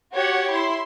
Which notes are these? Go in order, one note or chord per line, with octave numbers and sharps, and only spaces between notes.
F#4 G4 C#5 F#5
E4 C6